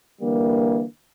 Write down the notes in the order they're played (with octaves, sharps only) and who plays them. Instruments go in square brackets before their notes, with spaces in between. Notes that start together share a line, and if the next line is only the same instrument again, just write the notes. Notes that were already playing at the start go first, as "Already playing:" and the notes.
[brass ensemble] D3 E3 G3 A#3